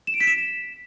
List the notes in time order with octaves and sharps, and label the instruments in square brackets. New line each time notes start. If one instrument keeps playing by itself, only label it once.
[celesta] E7
D7
B6
E7